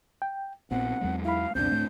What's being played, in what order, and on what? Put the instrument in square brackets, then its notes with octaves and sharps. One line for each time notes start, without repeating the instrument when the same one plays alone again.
[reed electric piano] G5
[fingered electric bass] A#1 A#2 B3 [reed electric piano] C4 [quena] F#5
[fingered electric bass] E2 F#3 G#3
[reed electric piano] E4 B5 [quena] F5
[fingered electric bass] C#2 F#2 B2 [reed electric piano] C4 D4 [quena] G6
[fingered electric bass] D1 A2 A3